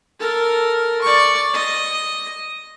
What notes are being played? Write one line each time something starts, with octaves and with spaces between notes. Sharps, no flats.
A4 A#4
D5 C#6
D#5